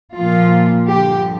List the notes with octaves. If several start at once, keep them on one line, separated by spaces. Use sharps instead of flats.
A#2 F3 F4
G2 D3 F3 G4